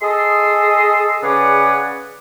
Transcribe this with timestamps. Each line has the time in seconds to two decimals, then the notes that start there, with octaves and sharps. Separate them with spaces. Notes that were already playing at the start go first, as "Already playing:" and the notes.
0.02 G#4 A4 D#5 C6 D#6
1.23 C#3 G#4 B4 C#5 D5 F#5